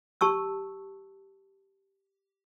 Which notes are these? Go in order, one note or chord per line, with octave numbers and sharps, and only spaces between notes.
G4 A5 C#6 E6